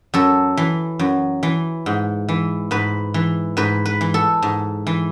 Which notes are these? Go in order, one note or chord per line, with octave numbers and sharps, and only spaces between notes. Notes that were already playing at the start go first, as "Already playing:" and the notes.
F#2 A4
E3
F#2
E3
G#2
E3
G#2 B4
E3
G#2 B4
B4
E3
A4
G#2
E3